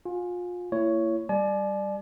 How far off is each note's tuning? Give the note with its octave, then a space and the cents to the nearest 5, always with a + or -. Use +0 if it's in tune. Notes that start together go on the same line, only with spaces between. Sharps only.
F4 +30 G#5 +0
A#3 -30 E4 +30 C#5 +5
G3 +0 D5 +25 G#5 +45